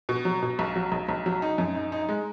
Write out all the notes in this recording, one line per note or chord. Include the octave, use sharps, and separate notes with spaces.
B2
F#3
B2
B1
F#3
B1
B1
F#3
D#4
F#2
D#4
D#4
G#3